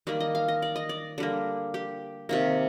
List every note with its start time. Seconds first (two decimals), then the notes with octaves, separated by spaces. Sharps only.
0.07 D#3 G3 A#3 D5
0.20 D#5
0.35 F5
0.48 D#5
0.62 D5
0.76 D#5
0.89 D5
1.18 D3 G3 A#3
1.74 G4
2.29 C3 D#3 A#3